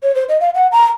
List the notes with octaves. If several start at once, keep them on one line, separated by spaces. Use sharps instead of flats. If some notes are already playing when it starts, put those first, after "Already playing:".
C#5
C5
D#5
F5
F#5
A#5